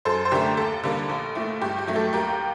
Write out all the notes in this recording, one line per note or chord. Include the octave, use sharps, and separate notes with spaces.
F#2 A4 C5
C5
D3 A3 G4 A#4
D#2 A4
D3 G3 A#3
A#1
A#2 A3
G2 G4
G4
F#3 A3
A4
D#2 G4 A#4